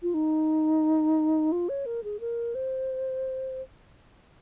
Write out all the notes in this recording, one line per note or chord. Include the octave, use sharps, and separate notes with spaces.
F4
D#4
F4
C#5
A#4
G#4
A#4
C5